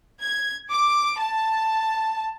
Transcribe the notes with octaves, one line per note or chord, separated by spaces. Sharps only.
G#6
D6
A5